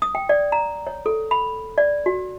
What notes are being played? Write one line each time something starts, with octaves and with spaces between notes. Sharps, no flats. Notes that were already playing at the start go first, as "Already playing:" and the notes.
D#6
G5
D5
A#5
C#5
A4
B5
D5
F#4